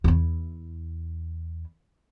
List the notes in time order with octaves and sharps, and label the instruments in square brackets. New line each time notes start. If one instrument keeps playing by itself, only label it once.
[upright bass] E2 E4